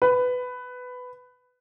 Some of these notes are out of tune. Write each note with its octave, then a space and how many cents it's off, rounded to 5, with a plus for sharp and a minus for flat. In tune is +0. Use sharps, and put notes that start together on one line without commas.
B4 +15